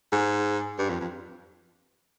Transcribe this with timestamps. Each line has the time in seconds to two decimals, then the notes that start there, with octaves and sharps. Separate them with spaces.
0.12 G#2
0.78 G2
0.90 F2
1.01 F2